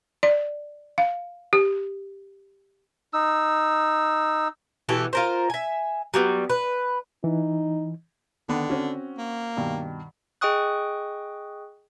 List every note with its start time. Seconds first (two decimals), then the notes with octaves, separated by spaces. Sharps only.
0.23 D5
0.98 F5
1.53 G4
3.13 D#4 E6
4.89 B2 E3 G4 A4
5.13 F4 A#4 C5
5.50 E5 G#5
6.14 F#3 G3 B3
6.50 B4
7.24 E3 D#4
8.49 D3 D#3 B3
8.69 C4 C#4 F#4
9.18 A#3
9.57 G2 B2 D#3
10.41 G#4 D#5 G5 C#6 D#6 F#6